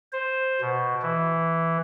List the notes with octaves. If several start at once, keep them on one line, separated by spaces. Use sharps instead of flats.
C5
B2
E3